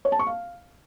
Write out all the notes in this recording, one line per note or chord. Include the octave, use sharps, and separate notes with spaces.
C#5
A5
C#6
F5